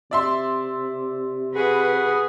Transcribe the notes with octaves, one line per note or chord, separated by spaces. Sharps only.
C3 D5 E5 C6
F#4 G#4 B4